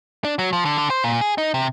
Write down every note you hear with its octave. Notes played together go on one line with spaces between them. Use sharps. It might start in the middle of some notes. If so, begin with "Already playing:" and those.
D4
F#3
F3
D3
D3
C5
A#2
G#4
D#4
C3